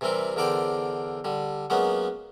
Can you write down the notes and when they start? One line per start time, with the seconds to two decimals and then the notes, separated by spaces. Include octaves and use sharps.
0.01 C3 E3 G3 C4 A#4
0.36 E2 D3 A#4 C5 D5 G5
1.24 D3 G3
1.70 F#3 G#3 A#3 B3 C#4 F#4